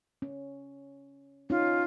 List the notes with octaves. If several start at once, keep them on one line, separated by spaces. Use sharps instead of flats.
C#4
C#4 D#4 F4